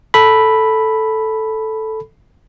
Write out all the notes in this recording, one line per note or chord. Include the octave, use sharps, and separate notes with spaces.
A4 B5